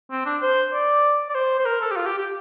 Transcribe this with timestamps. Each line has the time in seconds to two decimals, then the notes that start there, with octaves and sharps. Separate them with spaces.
0.11 C4
0.26 D4
0.42 C5
0.73 D5
1.30 D5
1.35 C5
1.59 C5
1.65 A#4
1.81 A4
1.91 G4
1.96 F4
2.07 G4
2.18 G4